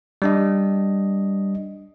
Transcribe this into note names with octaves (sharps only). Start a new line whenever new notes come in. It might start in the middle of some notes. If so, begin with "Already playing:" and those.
G3 D4 D#5